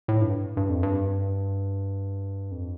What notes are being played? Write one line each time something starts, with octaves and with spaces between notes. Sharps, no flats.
A2
G2
G2
F2
G2
F2